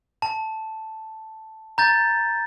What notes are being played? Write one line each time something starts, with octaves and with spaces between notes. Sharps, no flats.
A5
A#5 G6 A6